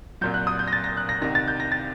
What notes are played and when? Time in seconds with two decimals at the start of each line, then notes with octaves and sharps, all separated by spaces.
0.21 C2 A#2 F#3 G6
0.34 F#6
0.47 D#6
0.59 G6
0.68 A#6
0.73 A6
0.84 A#6
0.97 F#6
1.09 A#6
1.21 C2 C3 D#3 A#6
1.35 A6
1.48 G6
1.60 A#6
1.72 A6